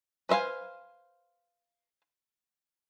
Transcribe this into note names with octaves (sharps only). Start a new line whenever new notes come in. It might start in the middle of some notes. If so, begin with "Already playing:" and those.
B4 C5 E5 F5 G#5